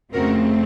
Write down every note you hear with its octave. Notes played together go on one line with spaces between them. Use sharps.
F2 C#3 A3 C4 F#4 A#4